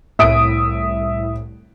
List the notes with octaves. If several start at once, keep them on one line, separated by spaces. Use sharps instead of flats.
C2 A2 E5 D#6 D7